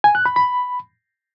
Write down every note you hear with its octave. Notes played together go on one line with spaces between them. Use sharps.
G#5
F#6
B5
B5